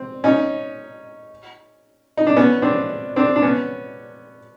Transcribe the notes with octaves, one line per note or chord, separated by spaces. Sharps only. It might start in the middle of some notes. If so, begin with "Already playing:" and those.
Already playing: C4
C#4 D#4
D#4
D4
B3 C#4
C4 D4
C4 D4
D4
B3 C#4